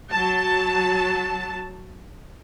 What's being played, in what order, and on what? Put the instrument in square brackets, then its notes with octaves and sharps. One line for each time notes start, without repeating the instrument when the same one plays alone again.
[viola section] F#3 A5